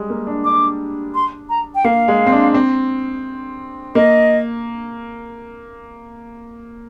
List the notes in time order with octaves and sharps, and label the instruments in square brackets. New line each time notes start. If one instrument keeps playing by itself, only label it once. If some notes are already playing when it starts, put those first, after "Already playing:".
Already playing: [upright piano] G3 G#3
A#3
D4
[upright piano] D4 [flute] D6
[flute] C6
A#5
G5
[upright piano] A#3 [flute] F5
[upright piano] G#3
C4
D4
C4
[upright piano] A#3 [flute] D#5